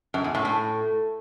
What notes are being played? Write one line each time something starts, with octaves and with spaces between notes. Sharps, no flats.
F#2
E2
A2
A2